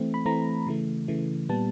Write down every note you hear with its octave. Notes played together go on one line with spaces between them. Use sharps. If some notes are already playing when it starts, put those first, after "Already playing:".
Already playing: E3 A3 C4
B5
E3 A3 C4 A#5
C#3 E3 A3
C#3 E3 A3
A#2 G3 B3 A5